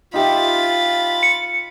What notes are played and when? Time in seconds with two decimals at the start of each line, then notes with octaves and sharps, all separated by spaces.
0.14 D#4 F4 G4 E5 B5 A6
1.23 C#7